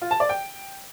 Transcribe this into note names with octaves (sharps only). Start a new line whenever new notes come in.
F4
A5
D5
G5